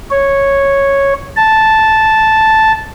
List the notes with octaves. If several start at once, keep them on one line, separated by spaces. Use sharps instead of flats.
C#5
A5